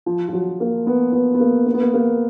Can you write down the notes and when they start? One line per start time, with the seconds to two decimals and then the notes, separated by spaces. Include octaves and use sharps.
0.06 F3
0.28 F3
0.33 F#3
0.60 A#3
0.87 B3
1.13 B3
1.34 B3
1.40 A#3
1.66 A#3
1.74 B3
1.81 A#3
1.94 A#3